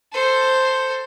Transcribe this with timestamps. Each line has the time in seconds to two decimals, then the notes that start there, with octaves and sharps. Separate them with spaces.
0.12 A4 C5